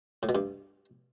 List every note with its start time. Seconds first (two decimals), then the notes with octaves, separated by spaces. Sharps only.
0.23 A2
0.29 B2
0.35 G2